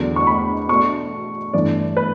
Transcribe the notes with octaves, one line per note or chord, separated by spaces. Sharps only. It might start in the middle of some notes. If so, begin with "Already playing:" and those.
Already playing: E2 D3 F#3 B3
C#6
B5
B2 A3 D4 C#6
G2 E3 A3 D4 D5
B4